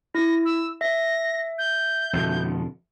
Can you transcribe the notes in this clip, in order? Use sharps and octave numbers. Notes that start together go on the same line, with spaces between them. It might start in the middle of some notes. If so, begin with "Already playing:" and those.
E4 A#6
E6
E5 A#6
G6
F2 B2 D3